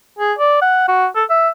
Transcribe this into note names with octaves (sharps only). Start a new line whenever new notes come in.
G#4
D5
F#5
F#4
A4
E5